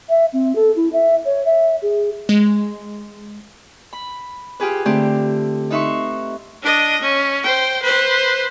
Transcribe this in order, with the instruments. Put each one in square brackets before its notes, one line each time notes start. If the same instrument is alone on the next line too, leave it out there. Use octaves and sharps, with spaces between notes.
[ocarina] E5
C4
A4
E4
E5
C#5
E5
G#4
[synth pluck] G#3
[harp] B5
F4 G4 G#4 B4
D3 A3 C4 G4
D#4 B4 E5 C6 C#6
[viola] D4 D#5
C#4
C5 G5
B4 C5